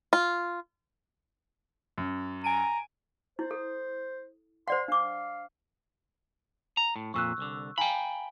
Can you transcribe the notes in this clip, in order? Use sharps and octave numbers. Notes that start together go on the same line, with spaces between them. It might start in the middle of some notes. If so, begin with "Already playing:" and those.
F4
F#2
G#5 A#5 D7 D#7
E4 C5
A4
C5 D5 F#5 C6
D4 F5 D6
A#5
A2
F2 A#2 C#6 E6 F#6
C2 D3
F5 G5 G#5 A#5 B5